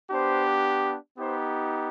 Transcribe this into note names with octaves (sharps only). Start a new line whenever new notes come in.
B3 D4 G4 C5
B3 D#4 G4 C5